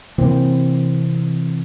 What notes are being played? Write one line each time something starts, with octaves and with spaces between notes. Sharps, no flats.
C3 E3 A#3 C4